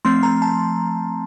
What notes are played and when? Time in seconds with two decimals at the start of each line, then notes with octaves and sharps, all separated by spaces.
0.05 F3 A3 C4 C6
0.23 A#5
0.42 A5